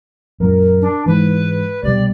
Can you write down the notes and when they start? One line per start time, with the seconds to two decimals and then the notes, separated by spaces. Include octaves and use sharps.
0.40 F#2 A#2 A#4
0.81 D4
1.06 G#2 E3 B4
1.83 C2 B2 G3 D5